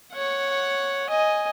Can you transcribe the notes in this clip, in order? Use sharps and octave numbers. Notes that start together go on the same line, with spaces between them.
C#5 F#5
D#5 G#5